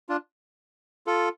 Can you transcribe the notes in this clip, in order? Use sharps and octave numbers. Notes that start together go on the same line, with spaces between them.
D4 F4
F4 A4